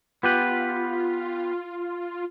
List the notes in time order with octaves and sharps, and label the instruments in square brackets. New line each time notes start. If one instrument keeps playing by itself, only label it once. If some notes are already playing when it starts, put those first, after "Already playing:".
[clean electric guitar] B3 G4 B4 [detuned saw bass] F4